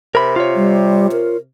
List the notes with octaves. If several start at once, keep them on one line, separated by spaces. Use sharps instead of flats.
C3 A#4 B5
F4 C#5
G3
A#4